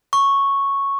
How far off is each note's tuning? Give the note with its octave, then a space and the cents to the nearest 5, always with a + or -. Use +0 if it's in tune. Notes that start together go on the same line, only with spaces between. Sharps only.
C#6 -5